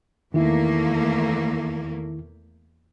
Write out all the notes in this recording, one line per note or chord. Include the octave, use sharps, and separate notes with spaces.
E2 D#3 A3 A#3 E4